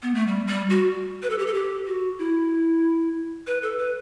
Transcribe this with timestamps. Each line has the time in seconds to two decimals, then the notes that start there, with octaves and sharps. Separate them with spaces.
0.03 B3
0.15 A3
0.27 G3
0.47 G3
0.70 F#4
1.23 B4
1.30 A4
1.39 G4
1.47 A4
1.54 G4
1.87 F#4
2.19 E4
3.47 B4
3.63 A4
3.78 B4